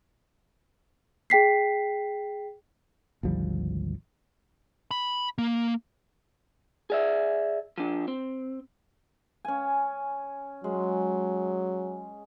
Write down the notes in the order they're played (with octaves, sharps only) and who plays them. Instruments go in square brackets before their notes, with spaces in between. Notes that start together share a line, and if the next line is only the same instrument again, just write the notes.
[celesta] G#4 G5 B6 C7
[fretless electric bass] G#1 D2 F3 G3
[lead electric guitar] B5
A#3
[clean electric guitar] G#4 D5 E5
F3 D4
C4
[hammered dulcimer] C#4 G#5
[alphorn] F#3 [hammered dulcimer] G#3